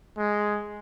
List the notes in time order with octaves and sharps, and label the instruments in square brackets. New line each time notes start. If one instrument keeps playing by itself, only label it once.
[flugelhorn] G#3